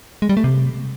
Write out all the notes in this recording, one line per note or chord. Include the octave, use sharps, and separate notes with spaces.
G#3
G3
A3
C3